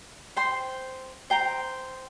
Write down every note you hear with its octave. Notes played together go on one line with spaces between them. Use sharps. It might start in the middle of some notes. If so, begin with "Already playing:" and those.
C5 G5 C6
C5 G5 A#5